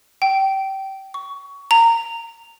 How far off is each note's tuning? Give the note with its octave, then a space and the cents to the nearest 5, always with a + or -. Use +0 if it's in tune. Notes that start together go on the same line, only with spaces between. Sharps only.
G5 -20
C#6 +15
A#5 -20